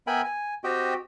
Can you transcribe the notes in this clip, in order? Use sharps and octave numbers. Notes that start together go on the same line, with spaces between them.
B3 A#4 E5 G5 G#5 B5
G#5
C4 F#4 G4 D#5 G5